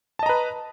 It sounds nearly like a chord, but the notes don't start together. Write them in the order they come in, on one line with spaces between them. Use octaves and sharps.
A5 D#5 A#5 B4